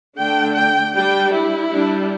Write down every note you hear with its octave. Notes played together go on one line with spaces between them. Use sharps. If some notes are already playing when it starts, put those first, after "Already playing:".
D3 A3 D4 G5
G5
G3 D4 G5
E4
G3 D4